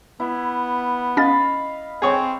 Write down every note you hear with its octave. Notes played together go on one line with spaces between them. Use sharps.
B3 E4
C#4 D#5 F5 B5 A6
C4 G#4 C#5